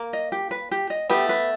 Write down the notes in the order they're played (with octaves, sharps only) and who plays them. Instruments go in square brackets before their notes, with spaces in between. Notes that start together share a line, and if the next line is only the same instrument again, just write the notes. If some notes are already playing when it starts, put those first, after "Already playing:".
Already playing: [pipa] A#3
[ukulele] D#5
G4
B4
G4
D#5
[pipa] A3 B3 [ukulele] G4
[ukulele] B4